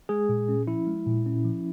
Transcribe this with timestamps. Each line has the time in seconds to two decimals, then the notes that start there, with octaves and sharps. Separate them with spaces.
0.09 G#3 G#4
0.29 A#2
0.49 C#4
0.67 F3 E4
0.87 G#3
1.06 A#2
1.26 C#4
1.44 F3